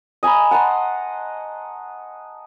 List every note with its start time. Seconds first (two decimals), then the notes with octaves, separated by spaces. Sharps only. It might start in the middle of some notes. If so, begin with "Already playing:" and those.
0.23 D#5 G#5 A#5 B5
0.51 F#5 A5 A#5 C6